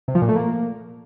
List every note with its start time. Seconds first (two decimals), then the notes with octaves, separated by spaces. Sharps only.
0.08 C3
0.15 F3
0.22 A#2
0.29 A3
0.36 A#3